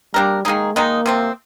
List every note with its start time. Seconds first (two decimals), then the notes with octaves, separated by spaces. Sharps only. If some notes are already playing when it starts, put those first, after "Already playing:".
0.14 G3 A#3 D4 G4 A#4
0.45 D#3 G#3 A#3 D#4 G#4
0.75 D#3 G#3 A#3 D#4
1.06 C3 F3 C4